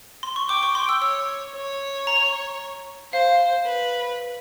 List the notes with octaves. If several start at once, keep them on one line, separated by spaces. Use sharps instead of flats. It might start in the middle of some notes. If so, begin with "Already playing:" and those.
C6
C#6
G5 D6
C#6
C6
E6
C#5 E6
C#5
A#5
C5 F5
B4